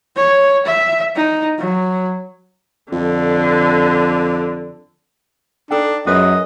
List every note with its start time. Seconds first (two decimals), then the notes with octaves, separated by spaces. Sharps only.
0.16 C#5
0.66 E5
1.16 D#4
1.59 F#3
2.92 F2 D3
5.71 D4 D#4 A4 G5
6.07 F#2 F4 G#4 B4 D#5